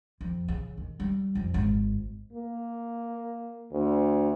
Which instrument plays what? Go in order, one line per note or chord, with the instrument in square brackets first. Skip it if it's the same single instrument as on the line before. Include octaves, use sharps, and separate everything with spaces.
[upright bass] F2
C#3
D#3
G3
F2
G#1
[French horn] A#3
D2